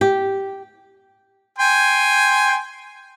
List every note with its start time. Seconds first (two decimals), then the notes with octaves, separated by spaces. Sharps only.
0.01 G4
1.59 G5 G#5 C6